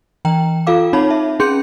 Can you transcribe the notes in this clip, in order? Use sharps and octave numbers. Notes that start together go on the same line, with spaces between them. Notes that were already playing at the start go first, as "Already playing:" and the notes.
E3 G5 A#5
F4 A4 F5 D6
C4 D#4 C#5 A5 B5
E5
C#4 G#4 C6 G6 C#7